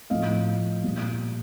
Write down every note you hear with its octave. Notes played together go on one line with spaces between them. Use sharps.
A2 F3 D#5 F5
A#2 G3